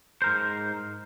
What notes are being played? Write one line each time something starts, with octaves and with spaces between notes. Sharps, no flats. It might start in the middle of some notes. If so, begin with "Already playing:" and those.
G#2 A#4 C5